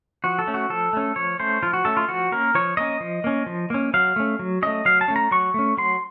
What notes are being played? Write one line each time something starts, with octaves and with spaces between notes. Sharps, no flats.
F3 F#4
A4
A3 C#4
F#4
F3 A4
A3 C#4
F3 C#5
A3 C#4 C5
F3 F4
F#4
A3 C#4 A4
F4
F3 F#4
A#3 C#4 A#4
F3 C#5
A#3 C#4 D#5
F3
A#3 C#4
F3
A#3 C#4
F#3 F5
A3 C#4
F#3
A3 C#4 D#5
F#3 F5
A5
A3 C#4
A#5
F#3 C#6
A3 C#4
F#3 C6